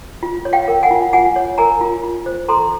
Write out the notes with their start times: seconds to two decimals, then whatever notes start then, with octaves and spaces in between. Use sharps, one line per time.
0.23 F4
0.45 C#5
0.53 F5 G5
0.68 A#4
0.83 F#5 G#5
0.91 F4
1.13 F4 F#5 G#5
1.36 C#5
1.58 A#4 G#5 A#5
1.81 F4
2.04 F4
2.26 C5
2.49 A4 A#5 C6